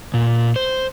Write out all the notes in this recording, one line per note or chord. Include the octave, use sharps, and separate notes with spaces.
A#2
C5